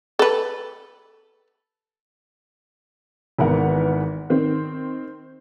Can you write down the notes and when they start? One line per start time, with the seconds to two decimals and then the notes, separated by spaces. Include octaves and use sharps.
0.19 A4 B4
3.39 G#1 E3 B3 A#4 B4 F#5
4.30 D#3 C4